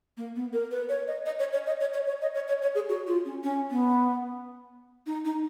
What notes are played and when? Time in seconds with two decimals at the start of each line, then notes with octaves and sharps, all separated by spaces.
0.17 A#3
0.36 B3
0.53 A#4
0.71 B4
0.89 C#5
1.08 D#5
1.26 D#5
1.39 C#5
1.53 C#5
1.67 D#5
1.80 C#5
1.94 C#5
2.07 C#5
2.22 D#5
2.35 C#5
2.48 C#5
2.62 C#5
2.75 G#4
2.89 F#4
3.07 F4
3.25 C#4
3.43 C#4
3.71 B3
5.06 D#4
5.25 D#4